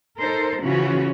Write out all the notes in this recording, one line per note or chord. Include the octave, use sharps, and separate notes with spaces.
D#4 A4 A#4 C5
C#3 E3 F3 C#4 F#4